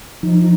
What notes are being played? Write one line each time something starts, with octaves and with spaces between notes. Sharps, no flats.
F3 D#4